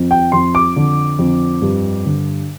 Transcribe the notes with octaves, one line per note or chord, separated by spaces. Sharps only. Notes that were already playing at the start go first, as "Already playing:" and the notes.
Already playing: F2
G5
F2 C6
D6
D3
F2
G2
D3